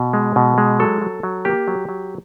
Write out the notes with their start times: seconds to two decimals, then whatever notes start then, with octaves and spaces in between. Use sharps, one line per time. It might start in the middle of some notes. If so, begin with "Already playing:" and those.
Already playing: B2
0.13 G#3
0.36 B2
0.58 G#3
0.79 F#3 A4
1.01 F#3
1.23 F#3
1.45 A#3 G4
1.68 F#3
1.89 F#3